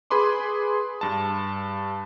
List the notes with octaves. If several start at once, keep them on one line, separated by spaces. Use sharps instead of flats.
G#4 B4 B5 C6 D6
G2 A5